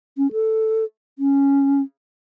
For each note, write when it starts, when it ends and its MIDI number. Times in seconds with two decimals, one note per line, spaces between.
0.18 0.31 61
0.32 0.84 69
1.19 1.81 61